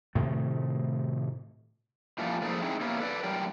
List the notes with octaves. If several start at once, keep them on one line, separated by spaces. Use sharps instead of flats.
A2 C3 D#3 A3
A#2 E3 F3 G3 A3
F3 A3 A#3 D4 E4 G#4
C4 D#4 E4 G#4
A#3 B3 C#4 E4 G4
A4 B4 D5
A2 D3 F#3 G3 A#4 G5